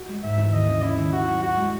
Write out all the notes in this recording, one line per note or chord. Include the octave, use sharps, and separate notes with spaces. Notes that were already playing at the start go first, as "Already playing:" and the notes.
Already playing: F#4
G#3
G#2 E5
E3
D#2 D#5
C#3
C#4 E4
D#3
E4 F#4
F#3
E4 F#4
G#3